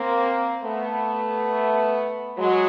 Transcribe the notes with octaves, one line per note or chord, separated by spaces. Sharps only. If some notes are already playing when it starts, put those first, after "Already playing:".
Already playing: A#3 C4
A3 B3
F#3 G#3